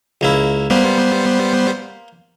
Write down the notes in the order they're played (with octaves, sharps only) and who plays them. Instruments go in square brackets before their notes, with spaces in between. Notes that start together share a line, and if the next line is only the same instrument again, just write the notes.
[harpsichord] C#2 A#3 E4
[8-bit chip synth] G3 B3 C5 [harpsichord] A#3